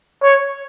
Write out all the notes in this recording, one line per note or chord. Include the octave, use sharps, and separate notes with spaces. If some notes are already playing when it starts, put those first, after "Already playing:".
C#5